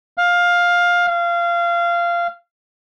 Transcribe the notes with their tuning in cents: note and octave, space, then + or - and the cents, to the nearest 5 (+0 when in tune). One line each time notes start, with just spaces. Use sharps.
F5 +15
F5 -20